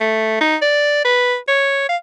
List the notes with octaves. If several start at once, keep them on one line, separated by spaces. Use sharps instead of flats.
A3
D#4
D5
B4
C#5
F5